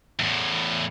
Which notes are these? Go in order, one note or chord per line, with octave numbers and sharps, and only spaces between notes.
E2 A2